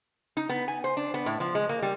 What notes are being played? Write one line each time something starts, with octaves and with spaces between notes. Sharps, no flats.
D#4
B3
G#5
C5
D4
B3
A2
F3
G#3
A#3
G3